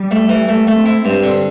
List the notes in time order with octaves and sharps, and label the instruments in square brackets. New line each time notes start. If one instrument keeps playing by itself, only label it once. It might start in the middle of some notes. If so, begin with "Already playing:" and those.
Already playing: [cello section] G3
[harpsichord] A3
E3
[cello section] G3 [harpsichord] A3
[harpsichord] A3
[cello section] C4
[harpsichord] E4
[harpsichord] G2 [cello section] C4
[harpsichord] D3